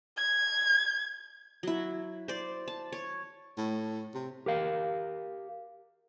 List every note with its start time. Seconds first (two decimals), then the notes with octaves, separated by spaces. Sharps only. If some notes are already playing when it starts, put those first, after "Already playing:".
0.17 G#6
1.63 F#3 E4
2.28 C5 D5
2.68 A5
2.92 C#5
3.58 A2
4.14 C3
4.46 G4 A#4 F5